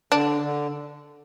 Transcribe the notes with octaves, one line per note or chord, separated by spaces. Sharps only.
D3 D4
D3